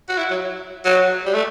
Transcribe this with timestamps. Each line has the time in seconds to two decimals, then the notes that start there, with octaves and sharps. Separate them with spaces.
0.09 F#4
0.18 E4
0.31 F#3
0.85 F#3
1.26 G3
1.34 A3